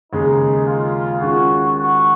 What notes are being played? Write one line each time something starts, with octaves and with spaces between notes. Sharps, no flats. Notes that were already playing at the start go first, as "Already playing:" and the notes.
D#2 C#3 G#3 D#4
F4
D#3 G#3 C#4 F4 F#4
F#4